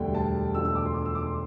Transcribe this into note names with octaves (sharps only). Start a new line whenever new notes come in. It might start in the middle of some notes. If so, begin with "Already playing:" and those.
Already playing: E1 D2 D3 G3 G5
A5
E1 D2 D3 F3 E6
E6
D6
C6
D6
E6
D6
C6